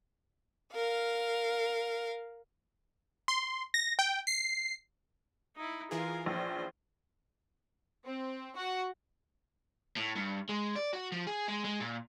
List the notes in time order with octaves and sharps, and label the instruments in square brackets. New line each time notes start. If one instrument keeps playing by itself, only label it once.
[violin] A#4 F5
[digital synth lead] C6
A#6
G5
C7
[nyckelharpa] D#4 E4
[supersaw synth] E3 F4 G#4 [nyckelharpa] A#4 F5
[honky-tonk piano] A#1 [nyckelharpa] C#4 C5
[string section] C4
F#4 F#5
[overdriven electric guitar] A2
G2
G#3
D5
F#4
F3
G#4
G#3
G#3
A#2